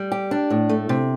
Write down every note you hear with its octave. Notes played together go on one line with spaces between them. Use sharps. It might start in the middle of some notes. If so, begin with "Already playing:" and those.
Already playing: G3
G4
D4
A2
A3
C3